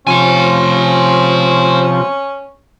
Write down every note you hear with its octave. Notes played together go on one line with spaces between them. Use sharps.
C3 F3 C#4 C5 G#5